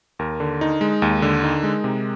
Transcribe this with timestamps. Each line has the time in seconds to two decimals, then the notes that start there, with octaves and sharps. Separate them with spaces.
0.19 D#2 A#4
0.40 D3
0.61 D#4
0.81 G#3
1.02 D#2
1.22 D3
1.43 D#4
1.63 G#3
1.84 C3